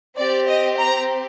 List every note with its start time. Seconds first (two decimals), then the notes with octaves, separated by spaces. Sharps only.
0.18 C4 G4 D5
0.48 D#5
0.78 A#5